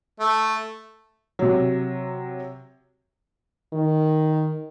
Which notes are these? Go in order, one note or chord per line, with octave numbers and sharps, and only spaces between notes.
A3
C3 F#3
D#3